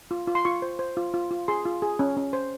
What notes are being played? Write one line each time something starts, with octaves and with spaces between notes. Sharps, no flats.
F4
F4
C6
F4 C#6
C5
C5
F4
F4
F4
G#4 C6
F4
G#4
C#4
C#4
C5